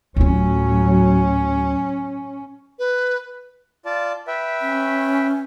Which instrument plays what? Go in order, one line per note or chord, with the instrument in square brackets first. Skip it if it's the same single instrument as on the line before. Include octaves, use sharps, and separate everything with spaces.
[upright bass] D2 F4 [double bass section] A2 F#3 [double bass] C#4
[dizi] B4
[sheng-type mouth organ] F4 D5 A5
B4 E5 G5
[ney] C#4